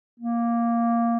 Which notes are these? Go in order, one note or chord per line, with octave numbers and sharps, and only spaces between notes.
A#3